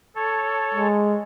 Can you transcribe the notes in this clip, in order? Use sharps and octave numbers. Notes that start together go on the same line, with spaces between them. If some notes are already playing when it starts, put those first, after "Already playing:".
A4 C#5
G#3